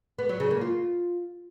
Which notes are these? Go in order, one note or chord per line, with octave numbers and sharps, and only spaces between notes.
B3
F#3
C#3
A#3
F4